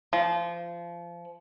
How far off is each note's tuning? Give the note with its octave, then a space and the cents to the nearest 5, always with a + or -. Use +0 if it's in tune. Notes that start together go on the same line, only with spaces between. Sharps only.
F3 -25